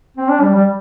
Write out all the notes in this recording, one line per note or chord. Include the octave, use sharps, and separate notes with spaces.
C4
D4
G3
G3